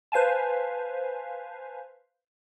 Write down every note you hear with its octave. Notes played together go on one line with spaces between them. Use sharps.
B4 C5 F5 G#5 A5